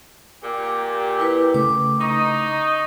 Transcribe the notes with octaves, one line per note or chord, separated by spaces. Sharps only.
A#2 G4
E4 B4
C#3 A3 D6
D#4 C#6